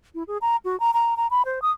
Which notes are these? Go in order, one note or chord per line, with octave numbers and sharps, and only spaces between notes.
E4
G#4
A#5
F#4
A#5
A#5
A#5
B5
C5
D#6